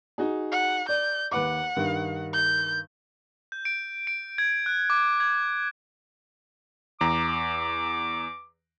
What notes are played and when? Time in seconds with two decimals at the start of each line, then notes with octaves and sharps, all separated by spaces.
0.18 D#4 F#4 G#4
0.52 F#5
0.89 D5 G6
1.32 D#2 B4 F#5 D6
1.76 G2 D#3
2.33 G6
3.52 G6
3.65 D7
4.07 D7
4.38 G#6
4.66 F#6
4.90 D6
5.20 G#6
7.01 E2 A#5 D6